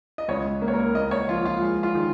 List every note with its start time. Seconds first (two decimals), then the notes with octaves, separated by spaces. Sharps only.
0.18 D#5
0.28 C#2 C#5
0.62 A#3
0.68 C#5
0.73 A#4
0.95 A#3 D#5
1.11 C#5
1.28 F3 F4
1.45 F4
1.61 G#3
1.83 F4
1.95 D#3